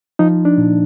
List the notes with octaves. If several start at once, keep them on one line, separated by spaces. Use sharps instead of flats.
F3 D#4
D4
A#2